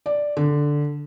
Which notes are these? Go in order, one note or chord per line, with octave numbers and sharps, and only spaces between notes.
D5
D3